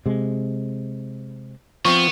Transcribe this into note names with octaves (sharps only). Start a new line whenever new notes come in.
C3 G#3
F3 B3 C4 C#6